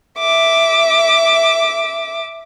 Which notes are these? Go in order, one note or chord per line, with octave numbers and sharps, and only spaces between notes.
E5 D6